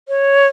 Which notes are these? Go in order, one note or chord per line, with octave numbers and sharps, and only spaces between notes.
C#5